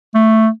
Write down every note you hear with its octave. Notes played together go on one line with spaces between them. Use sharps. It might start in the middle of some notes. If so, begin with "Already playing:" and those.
A3